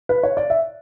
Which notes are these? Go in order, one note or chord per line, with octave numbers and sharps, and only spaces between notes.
B4
C#5
D5
E5